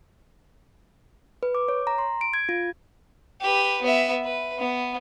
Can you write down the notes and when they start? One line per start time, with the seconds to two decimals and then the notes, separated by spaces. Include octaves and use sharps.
1.43 B4
1.55 D6
1.68 C#5
1.87 A#5
1.98 C6
2.21 D7
2.34 G#6
2.49 F4
3.41 G4 B4
3.82 B3 E5
4.24 B4
4.58 B3